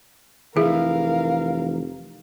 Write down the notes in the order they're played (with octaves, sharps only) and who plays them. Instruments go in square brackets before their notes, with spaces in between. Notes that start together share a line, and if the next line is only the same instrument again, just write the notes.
[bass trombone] F1 [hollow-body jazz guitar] E3 [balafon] G#4 [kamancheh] A#4 F5